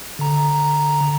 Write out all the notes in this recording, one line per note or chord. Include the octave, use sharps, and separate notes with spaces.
D3 A#5